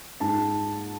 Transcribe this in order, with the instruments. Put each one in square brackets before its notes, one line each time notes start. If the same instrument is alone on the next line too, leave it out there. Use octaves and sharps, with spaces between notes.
[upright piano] G#2 A5